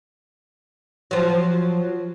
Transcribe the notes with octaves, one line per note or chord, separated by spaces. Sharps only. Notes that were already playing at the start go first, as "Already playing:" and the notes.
F3 F#3